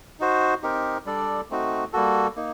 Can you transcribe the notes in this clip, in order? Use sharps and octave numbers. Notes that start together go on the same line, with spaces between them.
D#4 F#4 C5
C4 D#4 G4 A#4
G3 D4 A4 D5
A3 C4 D#4 F#4
G3 A#3 F#4 A4
A#3 D#4